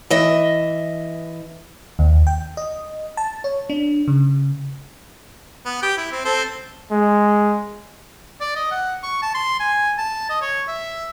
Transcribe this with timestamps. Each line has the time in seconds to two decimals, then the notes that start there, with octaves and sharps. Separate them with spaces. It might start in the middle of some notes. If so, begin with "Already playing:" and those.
0.10 E3 D#5 E5
1.99 D#2
2.27 G5
2.57 D#5
3.17 A5
3.44 C#5
3.70 D4
4.08 C#3
5.66 B3
5.82 G4
5.97 E4
6.12 C4
6.25 C4 A4 C5
6.91 G#3
8.41 D5
8.56 D#5
8.71 F#5
9.03 C#6
9.22 A5
9.34 C6
9.60 G#5
9.98 A5
10.29 D#5
10.41 C#5
10.68 E5